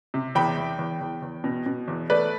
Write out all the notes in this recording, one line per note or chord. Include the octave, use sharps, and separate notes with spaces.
C3
E2 G5 B5
E2
E2
E2
E2
B2
B2
E2
A3 B4 D5